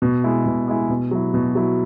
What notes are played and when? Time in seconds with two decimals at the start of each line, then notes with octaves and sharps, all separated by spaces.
0.02 B2
0.24 G#3 E4
0.46 B2
0.68 G#3 E4
0.90 B2
1.11 F#3 E4
1.34 B2
1.55 F#3 E4